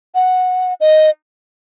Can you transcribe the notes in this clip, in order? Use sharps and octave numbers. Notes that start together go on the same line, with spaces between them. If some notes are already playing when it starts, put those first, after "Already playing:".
F#5
D#5